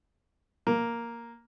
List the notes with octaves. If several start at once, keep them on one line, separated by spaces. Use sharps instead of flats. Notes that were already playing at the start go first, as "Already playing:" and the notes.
A#3